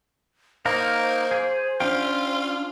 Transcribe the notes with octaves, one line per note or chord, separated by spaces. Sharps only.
A#3 D#4 C5 F5 A#5
G#4
C#4 D4 F4 G5